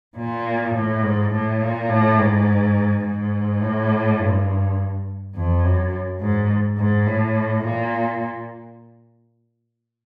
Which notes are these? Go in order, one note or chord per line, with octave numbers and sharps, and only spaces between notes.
A#2
A2
G#2
A2
A#2
A2
G#2
G#2
A2
G2
F2
F#2
G#2
G#2
A2
A#2